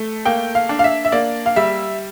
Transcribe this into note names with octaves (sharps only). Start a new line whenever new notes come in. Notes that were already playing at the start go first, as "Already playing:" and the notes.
Already playing: A3
A#3 G5
F5
D4
F5
E5
E5
A#3 D5
F5
G3 E5